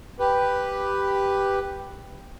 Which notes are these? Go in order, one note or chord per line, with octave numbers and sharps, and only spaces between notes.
G4 B4